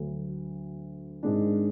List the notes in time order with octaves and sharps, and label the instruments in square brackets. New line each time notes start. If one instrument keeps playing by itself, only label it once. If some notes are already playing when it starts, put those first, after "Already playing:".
Already playing: [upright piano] D2 D3 F#3
G#1 G#2 G#3 D4